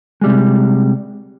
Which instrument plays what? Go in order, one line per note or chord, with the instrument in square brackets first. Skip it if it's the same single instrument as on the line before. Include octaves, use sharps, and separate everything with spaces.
[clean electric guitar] C3 G3 G#3